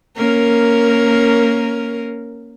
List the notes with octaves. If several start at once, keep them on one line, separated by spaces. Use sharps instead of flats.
A#3 C#4 A#4